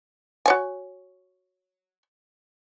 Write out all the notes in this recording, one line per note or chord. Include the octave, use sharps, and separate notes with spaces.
F#4 C#5 G#5